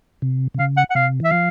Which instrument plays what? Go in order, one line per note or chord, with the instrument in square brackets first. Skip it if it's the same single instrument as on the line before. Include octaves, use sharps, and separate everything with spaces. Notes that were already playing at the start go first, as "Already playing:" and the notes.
[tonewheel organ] C3
C3
[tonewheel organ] C#3 [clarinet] F5
[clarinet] F#5
F#5
[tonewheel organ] C3 [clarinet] F5
[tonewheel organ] E3 [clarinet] E5
[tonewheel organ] F3 [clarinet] F5